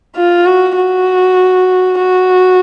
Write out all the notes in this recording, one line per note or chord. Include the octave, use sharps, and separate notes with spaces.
F4
F#4
F#4
F#4